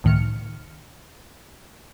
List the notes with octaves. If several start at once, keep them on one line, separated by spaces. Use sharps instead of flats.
C#2 A2 D#3 F6 C#7